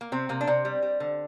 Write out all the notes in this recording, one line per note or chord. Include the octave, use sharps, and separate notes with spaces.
A#3
C3 C4
C3 A#3
D4
C3 C4
G3
G3
D3